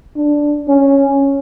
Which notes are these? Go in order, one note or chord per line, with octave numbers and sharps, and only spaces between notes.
D4
C#4